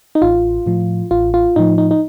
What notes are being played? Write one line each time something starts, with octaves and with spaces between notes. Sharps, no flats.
D#4
A1 F4
A2 F3
A1 F4
F4
A2 F3 D#4
D#4
D#4